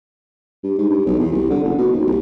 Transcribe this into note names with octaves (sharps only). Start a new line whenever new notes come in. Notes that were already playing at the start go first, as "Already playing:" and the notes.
G2
G#2
G2
B1
E2
C2
D3
F#1
B2
D#2
C2